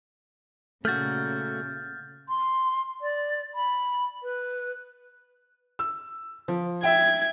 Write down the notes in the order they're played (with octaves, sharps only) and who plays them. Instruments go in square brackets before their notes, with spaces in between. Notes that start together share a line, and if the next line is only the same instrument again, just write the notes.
[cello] A#2 C#3 [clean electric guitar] A3 F#4 [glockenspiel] F6 G6 A6
[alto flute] C6
D5
B5
B4
[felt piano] E6
F3
[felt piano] E5 G5 [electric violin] G#6